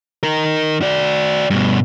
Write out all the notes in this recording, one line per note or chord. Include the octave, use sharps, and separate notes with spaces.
D#4 A#4
F#4 D5
G2 B2